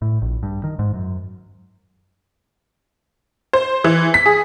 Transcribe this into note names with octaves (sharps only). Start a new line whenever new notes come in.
A2
A#1
G2
D#3
G#2
F#2
C5
E3
B6
G#4